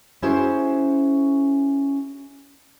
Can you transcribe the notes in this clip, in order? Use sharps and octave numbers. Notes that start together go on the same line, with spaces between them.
C#4 E4 F#4 G#4 C5